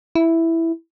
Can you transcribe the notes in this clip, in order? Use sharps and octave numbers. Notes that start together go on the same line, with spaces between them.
E4